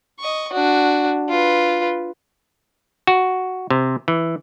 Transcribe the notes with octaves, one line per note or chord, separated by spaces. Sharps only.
D#5 C#6
D4 F#4
F4 B4
F#4
C3
E3